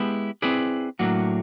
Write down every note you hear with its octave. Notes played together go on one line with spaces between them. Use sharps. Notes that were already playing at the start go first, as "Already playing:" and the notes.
Already playing: G#3 B3 E4 G4
C4 E4 G#4 B4 D5
A2 F#3 A#3 D4 F#4